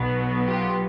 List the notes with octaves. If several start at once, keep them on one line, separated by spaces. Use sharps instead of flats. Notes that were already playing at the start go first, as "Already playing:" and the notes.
Already playing: B1 B2 F#3 B3
F4 G4